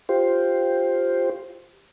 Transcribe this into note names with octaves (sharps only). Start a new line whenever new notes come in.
F4 G4 C5